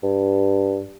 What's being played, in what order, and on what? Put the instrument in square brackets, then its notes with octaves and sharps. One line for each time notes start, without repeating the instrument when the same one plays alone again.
[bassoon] G2